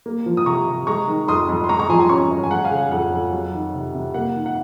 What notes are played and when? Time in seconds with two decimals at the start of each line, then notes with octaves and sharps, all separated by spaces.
0.06 A#3
0.26 F3
0.37 D#6
0.46 C3 A#5 C#6
0.67 C3
0.87 G#3 A#5 C#6
1.08 D#3
1.28 F2 C6 D#6
1.49 F2
1.64 C6
1.69 G#3 A#5 C#6
1.79 A#5 C#6
1.89 F3 G#5 C6
2.00 G#5 C6
2.09 C#4 A#5 C#6
2.30 F#2
2.44 G#5
2.51 G#3 F#5
2.64 F5 G#5
2.71 C#3
2.78 F#5
2.91 F2 F#5
3.12 F2
3.33 F#3
3.53 D#3
3.74 C3
3.95 C3
4.14 A#3 F#5
4.35 D#3
4.46 F#5